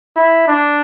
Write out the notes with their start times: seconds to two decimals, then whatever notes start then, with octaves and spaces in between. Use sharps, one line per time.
0.16 E4
0.48 D4